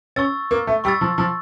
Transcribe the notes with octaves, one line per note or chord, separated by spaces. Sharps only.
C#4 C#6 E6 A6
A#3
A3
G3 C#6 E6 A6
F3
F3